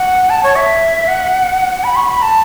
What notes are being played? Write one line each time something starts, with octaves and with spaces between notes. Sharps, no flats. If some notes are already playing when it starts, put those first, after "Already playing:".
Already playing: F#5
A5
C#5
E5
F#5
B5
C#6
B5
A5